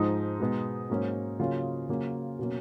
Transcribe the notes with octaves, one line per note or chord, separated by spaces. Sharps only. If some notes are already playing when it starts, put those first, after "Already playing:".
Already playing: G#2 F3 G#3 D#4
B2 G#3 B3
G#2 F#3 A#3 C#4
C#3 F#3 A#3 C#4 F4
C#3 F#3 A#3 C#4
B2 F#3 A#3 C#4